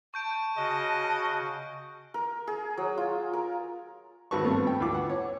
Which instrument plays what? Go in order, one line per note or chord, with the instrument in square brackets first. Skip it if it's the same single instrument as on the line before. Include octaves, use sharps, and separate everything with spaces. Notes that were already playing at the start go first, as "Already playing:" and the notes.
[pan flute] A5 [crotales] C#6 G6 D7
[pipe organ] C#3 F#4 [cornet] D#5
[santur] A#4
G#4
F#3
F4
A#4
[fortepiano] G#1 F#4 B4 A5 C#6
G2 A3 B3 C4
G5
D2 E3 F4 D6
F#5
C#5